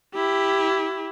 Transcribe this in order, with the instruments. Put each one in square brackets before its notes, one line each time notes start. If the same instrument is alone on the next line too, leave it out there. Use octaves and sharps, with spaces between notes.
[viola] E4 G4